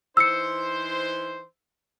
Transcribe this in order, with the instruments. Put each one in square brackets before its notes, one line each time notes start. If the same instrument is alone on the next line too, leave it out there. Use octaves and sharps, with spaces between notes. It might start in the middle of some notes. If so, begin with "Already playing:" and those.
[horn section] E3 D#4 C5 [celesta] E6 C#7